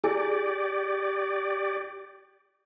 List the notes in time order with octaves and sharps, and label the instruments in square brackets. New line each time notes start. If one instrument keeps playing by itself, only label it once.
[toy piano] E4 G#4 G#5 [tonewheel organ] G4 D5